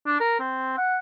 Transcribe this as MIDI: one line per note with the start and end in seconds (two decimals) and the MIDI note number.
0.06 0.18 62
0.20 0.37 70
0.39 0.77 60
0.77 0.98 78